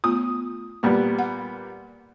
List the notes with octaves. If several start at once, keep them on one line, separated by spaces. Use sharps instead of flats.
A3 B3 F4 D#6
A#2 G3 A#3 B3
F#5